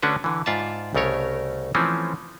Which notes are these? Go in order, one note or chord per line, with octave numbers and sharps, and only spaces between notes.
D3 A3 C#4 D4 F#4 B4
D3 E3
G#2 F4 D5 E5 A5
C2 C#3 A3 A#4 C#5
E3 F3 A3 C4 C#4